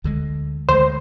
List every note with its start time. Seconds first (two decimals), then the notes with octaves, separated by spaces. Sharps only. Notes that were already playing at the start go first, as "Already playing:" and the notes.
0.04 D2 D3 G#3
0.69 D2 D3 G#3 C5